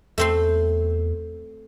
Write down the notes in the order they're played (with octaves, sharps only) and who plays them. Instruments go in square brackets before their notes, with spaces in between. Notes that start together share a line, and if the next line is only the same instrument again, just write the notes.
[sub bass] E2 [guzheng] A3 C4 C6